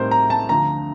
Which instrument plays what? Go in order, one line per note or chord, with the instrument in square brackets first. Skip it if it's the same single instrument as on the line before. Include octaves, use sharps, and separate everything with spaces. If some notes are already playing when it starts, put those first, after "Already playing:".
Already playing: [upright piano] A2 G3 C4 D#4 [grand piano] A#4 C5
[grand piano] A#5
A5
[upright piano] D2 D3 F3 [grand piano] A#5